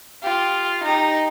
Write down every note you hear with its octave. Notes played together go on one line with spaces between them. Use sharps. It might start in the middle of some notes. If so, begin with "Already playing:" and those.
F4 G4
D#4 G4